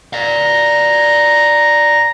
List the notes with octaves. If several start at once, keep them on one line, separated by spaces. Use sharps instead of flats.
D5 F5 A#5